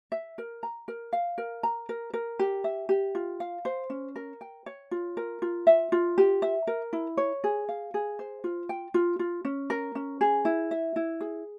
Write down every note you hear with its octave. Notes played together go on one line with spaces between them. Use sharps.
E5
A#4
A#5
A#4
F5
A#4
A#5
A#4
A#4
G4
E5
G4
F4
F5
C5
C#4
A#4
G5
C#5
F4
A#4
F4
E5
F4
G4
E5
A#4
E4
C#5
G#4
F5
G#4
C5
F4
G5
F4
F4
C#4
A#4
C#4
G#4
E4
E5
E4
G#4